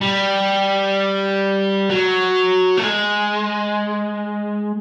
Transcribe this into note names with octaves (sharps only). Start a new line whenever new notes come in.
G3
F#3
A3
G#3